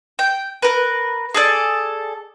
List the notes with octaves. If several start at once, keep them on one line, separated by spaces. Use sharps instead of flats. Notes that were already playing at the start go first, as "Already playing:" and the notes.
G5
A#4 B4
G#4 A4 D5